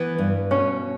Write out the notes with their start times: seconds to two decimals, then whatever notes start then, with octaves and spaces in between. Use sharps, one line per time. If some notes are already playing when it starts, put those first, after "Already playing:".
Already playing: E3 B3
0.18 G2
0.51 B2 C#4